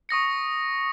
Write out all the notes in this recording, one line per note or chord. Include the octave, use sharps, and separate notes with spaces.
C#6 D#6 A#6 C#7